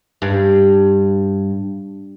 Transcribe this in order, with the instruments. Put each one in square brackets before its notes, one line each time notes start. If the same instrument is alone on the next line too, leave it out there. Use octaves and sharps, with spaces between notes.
[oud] G2